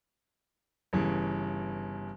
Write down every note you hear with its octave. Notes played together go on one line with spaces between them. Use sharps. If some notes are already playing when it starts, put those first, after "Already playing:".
G1 C#3 E3